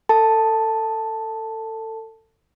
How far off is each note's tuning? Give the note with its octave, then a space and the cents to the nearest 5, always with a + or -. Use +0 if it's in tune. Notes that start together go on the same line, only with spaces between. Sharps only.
A4 +25 A5 +0